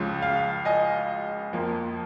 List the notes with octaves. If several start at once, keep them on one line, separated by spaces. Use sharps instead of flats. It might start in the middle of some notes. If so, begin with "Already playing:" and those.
Already playing: C#2 C#3 F3
F5
D#5 G#5
F2 F3 A#3